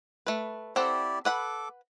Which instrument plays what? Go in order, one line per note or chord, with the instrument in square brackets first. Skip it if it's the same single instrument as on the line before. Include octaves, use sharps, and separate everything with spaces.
[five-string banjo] A3 B4
[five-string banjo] C4 A4 F#5 [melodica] E4 G4 D5
[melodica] A4 D6 [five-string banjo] B4 F#5 B5